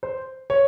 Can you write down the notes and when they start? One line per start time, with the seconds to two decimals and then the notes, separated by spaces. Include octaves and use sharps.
0.03 C5
0.50 C#5